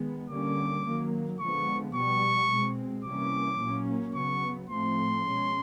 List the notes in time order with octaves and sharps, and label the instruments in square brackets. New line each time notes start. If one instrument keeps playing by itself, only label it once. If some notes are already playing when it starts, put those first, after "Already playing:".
Already playing: [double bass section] D#3 G#3 B3
[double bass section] D3 G3 A#3 C#4 [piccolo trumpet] D6
[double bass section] D#3 F#3 A#3
[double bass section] D3 F3 G#3 B3 [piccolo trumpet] C#6
[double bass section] B2 G3 B3 [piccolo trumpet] C#6
[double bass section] B2 G#3 C4
[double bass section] C3 E3 G3 A#3 C#4 [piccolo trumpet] D6
[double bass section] A#2 F#3 A#3 C#4
[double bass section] C#3 F#3 B3 [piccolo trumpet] C#6
[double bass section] A2 F3 A3 C4 [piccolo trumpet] C6
[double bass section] B2 G#3 C#4